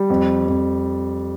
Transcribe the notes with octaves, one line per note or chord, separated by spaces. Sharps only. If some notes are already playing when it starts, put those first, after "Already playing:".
Already playing: G3
F2
F2